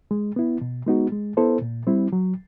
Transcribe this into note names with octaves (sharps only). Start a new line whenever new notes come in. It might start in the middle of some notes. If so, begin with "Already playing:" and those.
G#3
B3 E4
B2
G#3 B3 D#4 F#4
G#3
B3 E4 A4 C5
A#2
G3 C4 E4
F#3